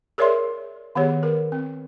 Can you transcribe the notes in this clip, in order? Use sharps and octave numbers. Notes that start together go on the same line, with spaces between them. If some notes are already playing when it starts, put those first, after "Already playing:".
G#4 A#4 C#5 D5 E5 C6
D#3 B3 G4 G#4 C#5
A#4 B4
C4